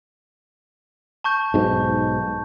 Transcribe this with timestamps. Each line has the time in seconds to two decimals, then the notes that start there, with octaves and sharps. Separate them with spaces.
1.24 A5 C#6 G6
1.54 B1 G#2